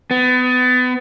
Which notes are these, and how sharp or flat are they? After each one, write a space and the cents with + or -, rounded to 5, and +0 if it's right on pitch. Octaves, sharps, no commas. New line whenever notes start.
B3 +30